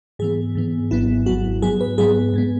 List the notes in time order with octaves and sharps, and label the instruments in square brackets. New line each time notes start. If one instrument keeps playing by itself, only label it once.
[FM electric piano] G#2 E3 B3 G#4
G#2 E3 B3
G#1 G#2 F#3 B3 E4
G#1 G#2 F#3 B3 F#4
G#2 F#3 B3 G#4
B4
G#2 F#3 B3 G#4
G#2 G#3 B3